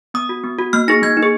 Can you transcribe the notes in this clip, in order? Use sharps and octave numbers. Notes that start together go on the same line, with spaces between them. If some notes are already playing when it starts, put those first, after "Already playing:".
B3 D#6
F#4
B3
F#4
A#3 F6
D#4 G#4 A#6
A#3 G#6
D#4
G#4